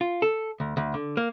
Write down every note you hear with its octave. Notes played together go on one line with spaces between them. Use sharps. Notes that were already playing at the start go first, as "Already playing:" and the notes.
F4
A4
D2
D2
D3
A#3